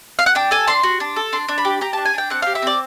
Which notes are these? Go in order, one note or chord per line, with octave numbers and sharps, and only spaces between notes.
F5
F#5
D4 G5
A4 G#5
D4 C6
F#4
D4
A4
D4 C6
D4
B5
G4
G4 A#5
D4 A5
G#5
D4 G5
C4 F#5
G4 F5
E5
C4 D5